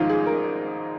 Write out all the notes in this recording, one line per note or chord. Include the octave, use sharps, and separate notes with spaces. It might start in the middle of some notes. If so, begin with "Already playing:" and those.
Already playing: G#1 G#2 F3 G#3 D#4 F4
G#4
A#4